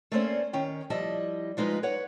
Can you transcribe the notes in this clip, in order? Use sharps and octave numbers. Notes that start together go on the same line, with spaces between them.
A3 A#3 C4 C#4 C5 D5
D#3 C#4 G5
F3 G3 E4 D#5 A5
F3 G#3 D#4 F4 B4
B4 C#5 F#5